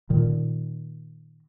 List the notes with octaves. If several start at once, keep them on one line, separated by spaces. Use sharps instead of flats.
A#2 D#3